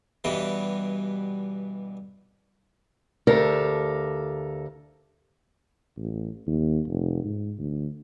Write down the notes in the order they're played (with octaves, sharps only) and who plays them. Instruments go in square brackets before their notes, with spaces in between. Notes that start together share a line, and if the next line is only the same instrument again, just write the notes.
[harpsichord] G2 B2 E3
[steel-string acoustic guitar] D2 G4 A4 A#4 F5
[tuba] A1
D#2
F1
G#2
D2